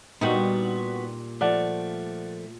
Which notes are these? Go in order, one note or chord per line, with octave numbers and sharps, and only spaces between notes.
A#2 G3 B3 D#4 F#4
F3 A3 D5 F#5